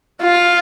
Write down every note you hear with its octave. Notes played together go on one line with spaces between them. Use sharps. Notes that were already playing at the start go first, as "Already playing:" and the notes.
F4